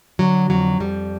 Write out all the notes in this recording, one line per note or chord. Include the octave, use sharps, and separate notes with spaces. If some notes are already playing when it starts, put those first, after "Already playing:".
D3 F#3
F2 F#3
F2 G3